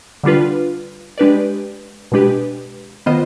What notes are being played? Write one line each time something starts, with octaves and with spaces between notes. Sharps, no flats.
D3 G3 D4 F4 B4
G#3 D4 G4 B4 D5
B2 G#3 D4 G4 B4
D#3 B3 F4 C5 D#5